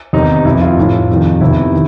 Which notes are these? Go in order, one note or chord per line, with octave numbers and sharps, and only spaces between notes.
E2 C3 D#3 D#4
F2 C3 E3 E4
F4
A2 E3
F2 C3 D#3
E2 C3 D#3 E4
D#3